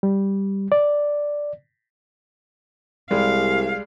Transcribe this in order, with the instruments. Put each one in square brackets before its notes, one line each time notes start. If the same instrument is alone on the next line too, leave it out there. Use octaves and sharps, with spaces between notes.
[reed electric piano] G3
D5
[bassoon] C2 [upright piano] G3 G#3 [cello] F5